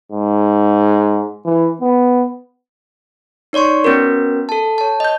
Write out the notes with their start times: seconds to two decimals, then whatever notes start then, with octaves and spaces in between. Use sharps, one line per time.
0.12 G#2
1.45 E3
1.81 B3
3.53 D#4 C#5 D5 C6 C#6
3.84 B3 C#4 F#4 A#4
4.49 A4 A5
4.78 C#5 A5
5.00 D#5 G6